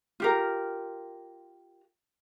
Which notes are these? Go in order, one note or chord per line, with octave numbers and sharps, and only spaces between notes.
F4 G4 A#4